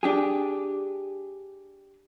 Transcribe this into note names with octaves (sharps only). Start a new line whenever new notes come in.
D4 G4 G#4